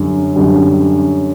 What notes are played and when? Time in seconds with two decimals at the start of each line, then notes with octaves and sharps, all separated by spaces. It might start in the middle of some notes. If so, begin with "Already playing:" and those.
Already playing: F#2 D3 G3
0.36 F#2 D3 G3